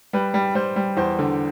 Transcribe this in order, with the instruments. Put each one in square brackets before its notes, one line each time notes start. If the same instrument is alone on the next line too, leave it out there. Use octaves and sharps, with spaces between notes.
[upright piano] G3 B4
G3
G3 C5
G3
E2 C5
D3